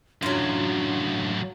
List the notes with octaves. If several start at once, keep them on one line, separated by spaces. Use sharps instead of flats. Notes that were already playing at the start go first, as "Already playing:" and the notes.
F#2 A2 F#3 D4 F4